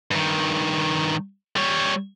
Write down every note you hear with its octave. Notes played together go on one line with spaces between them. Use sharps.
G2 D#3
G3 C#5